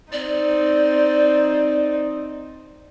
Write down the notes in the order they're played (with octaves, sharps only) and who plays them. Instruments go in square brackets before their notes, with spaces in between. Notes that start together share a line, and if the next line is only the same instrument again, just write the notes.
[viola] C4 D#4 [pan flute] D5